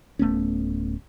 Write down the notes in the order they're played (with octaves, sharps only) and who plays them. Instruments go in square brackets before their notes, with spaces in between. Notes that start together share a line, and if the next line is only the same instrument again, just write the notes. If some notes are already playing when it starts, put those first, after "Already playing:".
[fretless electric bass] D1 A3 B3 C#4